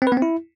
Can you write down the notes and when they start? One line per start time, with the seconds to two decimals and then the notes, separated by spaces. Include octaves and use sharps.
0.02 C4
0.07 B4
0.12 B3
0.17 C4
0.22 E4